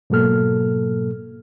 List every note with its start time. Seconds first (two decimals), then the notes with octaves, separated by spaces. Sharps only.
0.10 G#2 B2 F#3 A#3 A4 F6